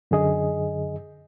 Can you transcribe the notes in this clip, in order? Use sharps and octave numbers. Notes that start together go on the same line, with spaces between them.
F#2 D3 G#4 D#5